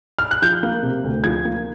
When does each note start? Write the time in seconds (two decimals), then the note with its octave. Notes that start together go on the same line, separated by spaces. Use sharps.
0.19 F6
0.31 F#6
0.42 F3 G6
0.63 A#3
0.83 C3
1.04 D2
1.24 F3 G#6
1.45 A#3